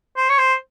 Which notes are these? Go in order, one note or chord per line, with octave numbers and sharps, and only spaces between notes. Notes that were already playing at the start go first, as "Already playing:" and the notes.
C5
C#5
C5